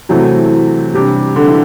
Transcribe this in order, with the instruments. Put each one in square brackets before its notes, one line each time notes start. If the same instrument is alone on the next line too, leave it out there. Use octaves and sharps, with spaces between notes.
[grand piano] C3 F#3 A3 C4 E4 [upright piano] E3
[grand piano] C3 G3 D4 G4
[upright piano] D3
E3